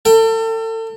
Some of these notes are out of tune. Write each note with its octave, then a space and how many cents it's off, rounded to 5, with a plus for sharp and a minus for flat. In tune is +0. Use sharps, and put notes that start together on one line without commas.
A4 +35 G5 +0